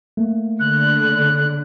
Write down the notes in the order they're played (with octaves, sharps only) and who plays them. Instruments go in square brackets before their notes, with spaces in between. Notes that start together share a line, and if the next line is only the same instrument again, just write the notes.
[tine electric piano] A3 A#3
[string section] D3 [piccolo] F#6